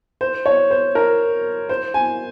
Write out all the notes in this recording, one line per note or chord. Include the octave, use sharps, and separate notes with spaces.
C5
C#5
C5
A#4
C5
G#5